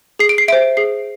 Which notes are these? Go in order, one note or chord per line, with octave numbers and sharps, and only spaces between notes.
G#4 C7
D7
C7
C5 E5 D7
G#4 C7